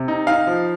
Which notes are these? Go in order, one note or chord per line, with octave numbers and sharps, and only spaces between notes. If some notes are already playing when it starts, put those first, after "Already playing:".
Already playing: C3
D#4
D#4 F5
F3